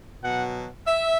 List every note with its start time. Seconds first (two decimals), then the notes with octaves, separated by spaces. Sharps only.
0.23 B2 F#3 F#5
0.87 E5